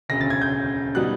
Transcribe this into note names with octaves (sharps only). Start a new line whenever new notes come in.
E1 D2 C#3 A#6
A6
G#6
G6
B2 G3 B3 D#4 F#6